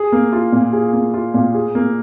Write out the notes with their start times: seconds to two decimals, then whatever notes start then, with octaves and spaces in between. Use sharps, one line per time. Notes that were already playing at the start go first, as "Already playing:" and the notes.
Already playing: G#4
0.12 A#3
0.33 F4
0.52 A#2
0.73 G#4
0.93 A#3
1.14 F4
1.34 A#2
1.54 G#4
1.75 A#3